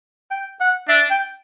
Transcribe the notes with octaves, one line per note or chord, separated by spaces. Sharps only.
G5
F#5
D4 E5
G5